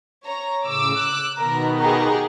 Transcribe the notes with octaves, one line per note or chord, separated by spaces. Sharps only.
C#5 A#5
A2 C#3 D6 E6
F#6
B2 D#3 B3 A#4 A#5
G4 G#4 F#5 A#5